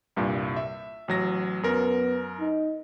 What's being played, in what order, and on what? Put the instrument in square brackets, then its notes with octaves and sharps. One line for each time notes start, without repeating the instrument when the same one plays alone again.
[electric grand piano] C2 G2 A#2
E5
A1 F#3 A#6
[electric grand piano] F#2 A#4 [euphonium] B3
[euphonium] D#4